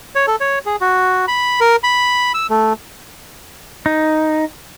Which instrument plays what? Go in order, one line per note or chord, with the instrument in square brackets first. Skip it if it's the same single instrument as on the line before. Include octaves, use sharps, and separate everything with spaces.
[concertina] C#5
A4
C#5
G#4
F#4
B5
A#4
B5
E6
A3
[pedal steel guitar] D#4